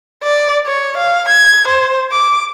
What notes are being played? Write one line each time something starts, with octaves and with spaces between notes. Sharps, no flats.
D5
C#5
F5
G#6
C5
D6